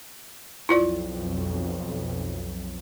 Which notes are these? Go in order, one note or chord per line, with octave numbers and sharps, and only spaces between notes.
B1 F2 E4 F4 D5